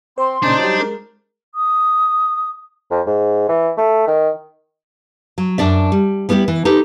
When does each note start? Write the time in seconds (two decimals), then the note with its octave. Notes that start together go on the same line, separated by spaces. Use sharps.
0.18 C4 C5 C6
0.43 A#2 C#3 D4 D#4 C5 D5 G#5
0.59 F#3 G3
0.79 G#3 A#4
1.55 D#6
2.91 F2
3.07 G#2
3.49 E3
3.78 A3
4.07 D#3
5.38 F#3
5.58 F#2 D4 D5 E5
5.92 G3
6.29 G3 B3 E4 F#4 G4
6.48 E3
6.65 D#4 G4 A4 B4